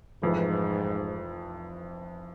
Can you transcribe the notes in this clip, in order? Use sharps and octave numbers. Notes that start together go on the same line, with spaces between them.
F1 F2 G#2 E3